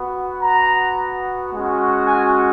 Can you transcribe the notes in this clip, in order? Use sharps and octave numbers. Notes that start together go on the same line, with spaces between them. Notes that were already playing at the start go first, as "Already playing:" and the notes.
Already playing: B3 F#4
A#5
G#3 C#4 F#4
G#5